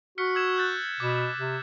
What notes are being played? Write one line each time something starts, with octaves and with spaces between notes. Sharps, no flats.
F#4 F6 B6 C#7
E6 G#6 E7
F#6 G6 A6
B2 D6
C3